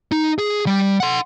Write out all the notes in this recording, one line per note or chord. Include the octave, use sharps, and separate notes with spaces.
D#4
G#4
G3
F#5 C6